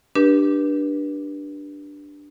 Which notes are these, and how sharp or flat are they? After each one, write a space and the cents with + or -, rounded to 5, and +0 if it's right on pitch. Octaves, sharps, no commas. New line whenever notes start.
D4 +0 G4 -10 B4 -35